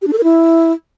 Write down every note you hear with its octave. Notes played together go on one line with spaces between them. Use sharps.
G4
D4
A4
A#4
E4